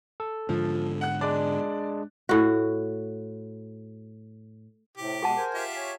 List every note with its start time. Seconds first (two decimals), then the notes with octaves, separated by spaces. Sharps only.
0.20 A4
0.49 G#2 D3 F3
1.01 F#5 F#6
1.21 G#3 D4 D5
2.29 A2 F#4
4.97 A2 C3 G4
5.23 B2 G#3 G#4 F#5 A5
5.37 A#4 C5 G#5
5.54 F4 G4 E5
5.76 C#5 G#5